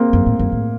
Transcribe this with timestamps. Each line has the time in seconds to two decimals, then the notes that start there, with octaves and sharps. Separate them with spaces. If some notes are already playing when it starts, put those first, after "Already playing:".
Already playing: A#3 C4
0.13 F#2
0.26 A2
0.39 F#2
0.52 A2